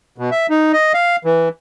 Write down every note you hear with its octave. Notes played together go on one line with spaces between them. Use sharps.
B2
E5
D#4
D#5
F5
E3